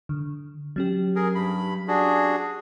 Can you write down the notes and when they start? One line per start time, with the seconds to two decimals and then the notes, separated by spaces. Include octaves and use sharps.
0.09 D3
0.76 F#3 C#4 G4
1.16 G#4 A#4
1.35 G2 B5
1.88 D4 F#4 G#4